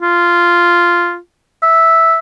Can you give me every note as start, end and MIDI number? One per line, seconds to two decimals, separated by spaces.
0.02 1.17 65
1.63 2.18 76